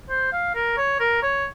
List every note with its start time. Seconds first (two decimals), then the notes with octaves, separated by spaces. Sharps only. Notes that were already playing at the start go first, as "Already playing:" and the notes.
0.10 C5
0.33 F5
0.55 A#4
0.77 C#5
1.00 A#4
1.23 C#5